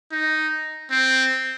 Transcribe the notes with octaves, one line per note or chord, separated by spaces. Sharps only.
D#4
C4